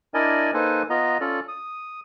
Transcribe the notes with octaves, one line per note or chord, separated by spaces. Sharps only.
D4 E4 A#4 D5 D#5 G#5
A#3 D#4 A4 B4 C5 G#5
B3 F4 D#5 A#5
C#4 F4 A4 D5
D#6